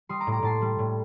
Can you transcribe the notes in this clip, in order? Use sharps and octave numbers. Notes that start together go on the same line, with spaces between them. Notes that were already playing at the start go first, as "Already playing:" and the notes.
G3 C6 D#6
A#5 D6
A2
A#5 D6
A2 A5 C6
G3
A2